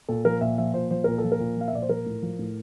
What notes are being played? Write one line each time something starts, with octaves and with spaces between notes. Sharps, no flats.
A#2 A4
F3 A#4
A#2 E5
F3 E5
A#2 C5
F3 C5
A#2 A#4
A4
F3
A#4
A#2
F3 F5
E5
A#2 D5
C5
F3 A#4
A2
F3
A2